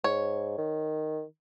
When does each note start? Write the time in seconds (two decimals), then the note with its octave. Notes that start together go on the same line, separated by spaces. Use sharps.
0.04 G#2 C#5
0.58 D#3